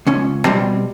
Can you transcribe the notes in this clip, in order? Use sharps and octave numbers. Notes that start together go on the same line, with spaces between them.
C#2 C#4
B2 G3 C4